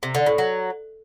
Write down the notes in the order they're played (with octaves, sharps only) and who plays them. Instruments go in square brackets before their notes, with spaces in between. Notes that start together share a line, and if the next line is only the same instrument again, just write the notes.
[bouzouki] C3
D3
A2
F#3